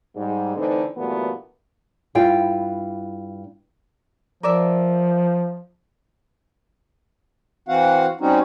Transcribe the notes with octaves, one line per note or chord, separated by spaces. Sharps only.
G#2 G3
D3 E3 A3 C4 D#4
G2 A#2 E3 F#3 A3 B3
G2 E4 F4 G5
F3 A#4 D5 E5
E3 C4 F#4 F5 F#5
G3 C4 C#4 D#4 F#4